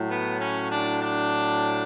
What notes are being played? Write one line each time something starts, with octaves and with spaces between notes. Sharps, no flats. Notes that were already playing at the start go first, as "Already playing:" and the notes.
Already playing: A2 F#3
B3
C#4
D4
D4